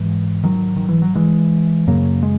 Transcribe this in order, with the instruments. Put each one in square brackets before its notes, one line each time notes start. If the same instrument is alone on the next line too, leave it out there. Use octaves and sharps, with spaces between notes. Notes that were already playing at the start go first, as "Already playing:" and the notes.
Already playing: [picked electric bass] G#2 E3 G#3
D#3 F#3
D#3
E3
F#3
E3 G#3
F#2 C#3 F#3 A#3
G#3